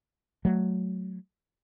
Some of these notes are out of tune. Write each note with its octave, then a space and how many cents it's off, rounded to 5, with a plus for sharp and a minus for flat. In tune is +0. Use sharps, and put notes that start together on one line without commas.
F#3 +0 A3 -15